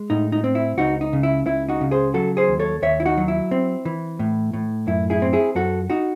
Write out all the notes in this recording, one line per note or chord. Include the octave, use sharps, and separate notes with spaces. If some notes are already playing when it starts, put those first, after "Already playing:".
Already playing: G#3
A2 D#4
D#4
C4
E4
C#2 D#4 F#4
D#4
C#3
E4
C#2 E4
D#4 F#4
C#3
G#4 C5
F#3 F#4 A4
G#4 C5
D#2
A4 C#5
D#2 C#5 E5
E4
D#4 F#4
F#3
E4
C4
E3
A2
A2
F#2 E4
E4 G#4
C4
E4 G#4
F#2 F#4 A4
D#4 F#4